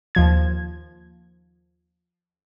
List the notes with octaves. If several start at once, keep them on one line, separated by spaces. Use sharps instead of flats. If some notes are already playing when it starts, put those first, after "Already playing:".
D#2 F3 G#6